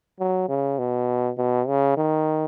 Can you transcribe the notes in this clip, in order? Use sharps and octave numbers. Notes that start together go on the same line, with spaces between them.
F#3
C#3
B2
B2
C#3
D#3